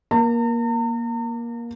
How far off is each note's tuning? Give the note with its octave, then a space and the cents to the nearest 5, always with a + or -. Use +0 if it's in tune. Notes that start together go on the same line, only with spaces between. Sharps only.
A#3 +20 A#5 -45